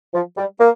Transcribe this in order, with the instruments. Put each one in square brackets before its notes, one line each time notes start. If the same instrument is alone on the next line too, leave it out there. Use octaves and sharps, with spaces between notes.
[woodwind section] F3
G3
A#3